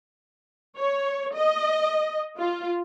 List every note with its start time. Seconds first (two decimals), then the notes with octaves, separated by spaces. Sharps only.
0.78 C#5
1.35 D#5
2.38 F4